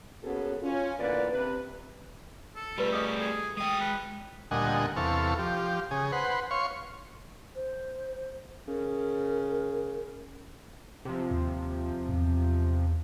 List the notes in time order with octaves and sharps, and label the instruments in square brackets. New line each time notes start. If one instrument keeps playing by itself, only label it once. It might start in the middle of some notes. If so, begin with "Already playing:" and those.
[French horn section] A#3 B3 C#4 F#4 G#4 A4
C#4 F4
E2 A#2 D3 F4 B4 D5
C3 B4
[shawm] A4
[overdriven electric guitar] G3 A3 [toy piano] F4 G4 B4
[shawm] C#4 [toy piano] D#5 D6 D#6
[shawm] G#4 [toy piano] A4
[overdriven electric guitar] G#3 G5 [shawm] D#6
[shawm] B4
[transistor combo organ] D2 A#2 G3 D#5 F#5 G#5
E2 C3 A4 F5 C#6
F3 G4
C#3 G#4
B4 C5 F#5
C#5 F5 C6 C#6
[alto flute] C5
[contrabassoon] C#3 [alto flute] A#4
[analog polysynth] C3 F3
[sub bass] D#2
E2